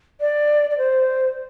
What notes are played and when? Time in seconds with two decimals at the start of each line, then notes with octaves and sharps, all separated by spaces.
0.21 D5
0.70 D5
0.78 C5